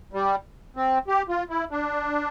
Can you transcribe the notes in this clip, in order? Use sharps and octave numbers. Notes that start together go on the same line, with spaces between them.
G3
C4
G4
F4
E4
D4